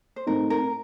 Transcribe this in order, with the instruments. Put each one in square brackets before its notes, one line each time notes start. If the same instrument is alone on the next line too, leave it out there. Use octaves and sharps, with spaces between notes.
[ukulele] C5
[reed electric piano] A2 A3 C4 D#4 [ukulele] A#4
[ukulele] A#4